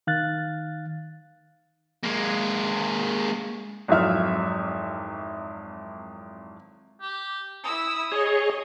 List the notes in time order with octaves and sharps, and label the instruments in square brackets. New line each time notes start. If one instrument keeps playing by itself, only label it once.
[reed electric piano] D#3 F5 F#6 A6
[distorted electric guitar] G#3 A#3
[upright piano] G#1 F2 F#3 E4 E5 F6
[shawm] G4
[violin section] E4 E6 [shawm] D#6
[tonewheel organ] G#4 C#5 [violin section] D#5